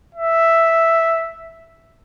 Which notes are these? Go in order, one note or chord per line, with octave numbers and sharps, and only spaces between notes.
E5